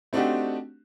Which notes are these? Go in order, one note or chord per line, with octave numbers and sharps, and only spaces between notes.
A3 C4 D4 D#4 F#4 G4